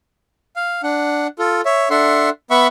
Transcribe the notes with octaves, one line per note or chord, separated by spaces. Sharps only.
F5
D4 F#5
F4 A4
C#5 E5
D4 A4 E5 F#5 C6
B3 E5 F#5 B5 C#6